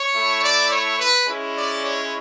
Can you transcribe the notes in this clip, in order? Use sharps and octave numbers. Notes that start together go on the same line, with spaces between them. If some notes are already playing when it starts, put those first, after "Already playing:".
Already playing: C#5
A3 E4
D5
C#5
B4
G#3 C#4 E4
D5
C#5